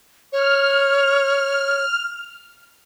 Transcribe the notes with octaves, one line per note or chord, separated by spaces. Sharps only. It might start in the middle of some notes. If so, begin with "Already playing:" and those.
C#5 F6